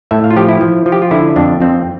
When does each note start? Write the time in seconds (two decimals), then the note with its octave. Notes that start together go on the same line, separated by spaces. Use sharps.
0.11 A2 E5
0.24 F5
0.31 F4
0.37 F3 G4
0.49 E4
0.61 F3
0.86 F3
0.92 G4
1.02 F4
1.11 D3 E4
1.36 F2 D4
1.61 F2 C4